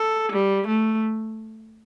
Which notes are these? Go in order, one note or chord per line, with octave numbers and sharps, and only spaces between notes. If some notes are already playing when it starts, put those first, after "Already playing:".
Already playing: A4
G3
A3